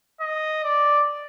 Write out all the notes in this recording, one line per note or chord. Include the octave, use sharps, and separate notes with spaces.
D#5
D5